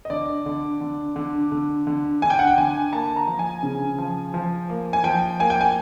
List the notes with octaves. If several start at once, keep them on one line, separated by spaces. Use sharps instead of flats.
D#5
D3 D5
D3
D3
D3
D3
D3
D3 G#5
G5
F#5
G5
D3 G#5
A#3 A5
A#5
F3
G#5
C#3
F3
F3
A#3
G#5
F3 G5
A#3 G#5
G5
G#5